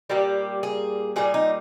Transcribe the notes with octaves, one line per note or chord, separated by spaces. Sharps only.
A#2 G3 A#3 G4
G#4
A#2 G3 A#3 G#4
D#4